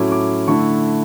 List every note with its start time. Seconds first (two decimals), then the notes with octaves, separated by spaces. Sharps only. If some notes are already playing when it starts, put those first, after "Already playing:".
Already playing: A2 F#3 A3 C#4 E4 D6
0.12 D6
0.48 D3 A3 E4 C#6